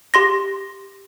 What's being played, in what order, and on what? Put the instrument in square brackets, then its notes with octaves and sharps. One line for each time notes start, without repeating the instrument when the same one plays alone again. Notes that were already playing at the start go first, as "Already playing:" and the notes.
[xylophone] G4 C6 A#6